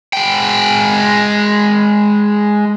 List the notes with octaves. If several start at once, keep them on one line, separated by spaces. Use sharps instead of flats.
G#3 G5